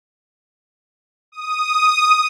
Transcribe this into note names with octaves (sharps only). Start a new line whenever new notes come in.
D#6